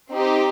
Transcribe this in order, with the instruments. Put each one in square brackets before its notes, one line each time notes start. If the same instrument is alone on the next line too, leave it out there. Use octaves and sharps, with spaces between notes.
[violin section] C4 D#4 G4